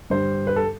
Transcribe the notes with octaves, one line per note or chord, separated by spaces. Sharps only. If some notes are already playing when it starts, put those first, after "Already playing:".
G2 D3 G3 C5
B4
A4